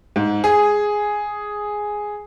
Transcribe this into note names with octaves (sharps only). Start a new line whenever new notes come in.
G#2
G#4